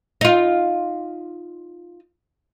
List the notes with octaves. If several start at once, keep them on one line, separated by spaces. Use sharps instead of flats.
D#4 F4